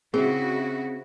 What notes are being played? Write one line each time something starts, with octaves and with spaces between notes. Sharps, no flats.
C#3 C4 E4 F#4 G#4